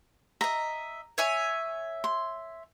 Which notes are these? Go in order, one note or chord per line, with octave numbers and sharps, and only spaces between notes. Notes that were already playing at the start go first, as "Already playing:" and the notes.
D#5 E5 A#5
C#5 E5 G#5
C6